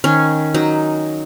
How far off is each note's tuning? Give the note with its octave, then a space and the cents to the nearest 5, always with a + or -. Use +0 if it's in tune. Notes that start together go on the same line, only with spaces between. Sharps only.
D#3 +0 C#4 +0
F#3 +0 D#4 +0